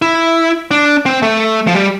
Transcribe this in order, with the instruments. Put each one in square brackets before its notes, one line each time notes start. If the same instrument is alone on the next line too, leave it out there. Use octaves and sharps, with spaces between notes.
[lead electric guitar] E4
D4
C4
A3
F3
G3